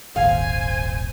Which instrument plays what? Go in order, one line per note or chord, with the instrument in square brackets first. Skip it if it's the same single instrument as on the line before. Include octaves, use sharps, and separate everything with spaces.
[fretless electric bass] D#1 G#1 [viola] C5 G#5 [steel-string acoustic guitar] F5